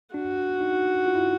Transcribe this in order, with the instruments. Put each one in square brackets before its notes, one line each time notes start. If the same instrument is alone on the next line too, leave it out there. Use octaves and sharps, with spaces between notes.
[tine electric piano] D4 [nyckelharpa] F#4
[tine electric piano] D#4
F4
E4